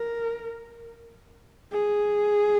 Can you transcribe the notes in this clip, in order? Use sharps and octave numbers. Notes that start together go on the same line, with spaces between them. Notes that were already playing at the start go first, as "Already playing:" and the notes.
Already playing: A#4
G#4